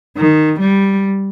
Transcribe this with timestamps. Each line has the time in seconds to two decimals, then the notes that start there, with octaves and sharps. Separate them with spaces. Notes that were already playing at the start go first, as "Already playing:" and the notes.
0.18 D#3
0.60 G3